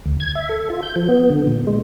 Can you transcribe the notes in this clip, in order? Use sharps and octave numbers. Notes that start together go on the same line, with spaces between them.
D2
G#6
E5
A4
F4
G6
F3
B3
D3
A#2
G#3